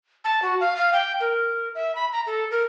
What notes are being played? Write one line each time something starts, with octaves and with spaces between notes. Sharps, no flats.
A5
F#4
F5
F5
G5
A#4
E5
B5
A#5
A4
A#4